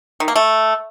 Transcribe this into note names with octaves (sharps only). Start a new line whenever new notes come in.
D#3
A#3
A3